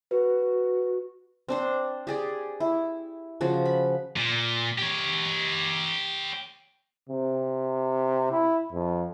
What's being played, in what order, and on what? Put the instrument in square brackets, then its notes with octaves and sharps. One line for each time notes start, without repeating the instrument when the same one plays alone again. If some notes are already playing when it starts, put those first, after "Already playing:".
[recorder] F#4 [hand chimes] B4
[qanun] C4 D4 C5
G4 G#4 D5
E4
C#3 F3 F#4
B5
[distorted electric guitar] A#2
G4 C#5
[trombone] C3
E4
F2